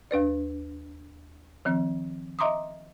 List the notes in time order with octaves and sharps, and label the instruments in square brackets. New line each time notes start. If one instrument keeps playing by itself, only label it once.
[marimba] D#2 D4 B4 D5
D#3 F3 C4
D#5 E5 A#5 C6 D6 D#6